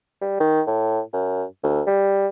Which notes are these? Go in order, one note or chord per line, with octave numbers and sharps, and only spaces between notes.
G3
D#3
A2
F#2
D2
G3